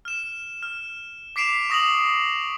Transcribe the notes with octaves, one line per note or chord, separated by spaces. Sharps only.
F6 E7
F6
D6 B6 C7 D7 E7 F7
C#6 D#6 A#6 B6 F7 F#7